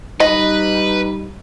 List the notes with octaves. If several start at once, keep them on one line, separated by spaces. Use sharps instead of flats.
G3 D#4 B4 D#5